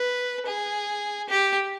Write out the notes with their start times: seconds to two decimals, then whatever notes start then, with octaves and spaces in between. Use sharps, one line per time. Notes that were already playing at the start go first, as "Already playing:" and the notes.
Already playing: B4
0.46 G#4
1.29 G4